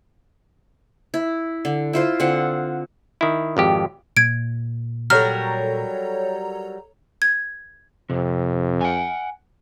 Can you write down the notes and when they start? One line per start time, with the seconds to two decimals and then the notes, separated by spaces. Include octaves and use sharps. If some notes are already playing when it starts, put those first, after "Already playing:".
1.14 E4
1.65 D3
1.93 E4 F4 C5
2.20 D3 C4 F4 F#5
3.21 D#3 E4
3.57 G#1 F2 G4
4.17 A#2 G#6 D7
5.10 F#3 G3 A4 A#4 C#5 A#5 F6
7.22 G#6
8.10 F2 C3
8.81 F#5 G#5